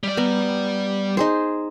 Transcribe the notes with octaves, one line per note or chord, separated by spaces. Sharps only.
G3 D5
B3 A#5
D#4 G#4 C5